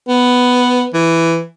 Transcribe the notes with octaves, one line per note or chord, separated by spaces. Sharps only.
B3
E3